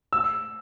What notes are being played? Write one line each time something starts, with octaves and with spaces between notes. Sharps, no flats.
E6